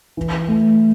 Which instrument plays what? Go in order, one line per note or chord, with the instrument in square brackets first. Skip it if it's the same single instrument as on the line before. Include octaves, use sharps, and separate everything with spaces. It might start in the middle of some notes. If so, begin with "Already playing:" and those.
[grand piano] E3
A3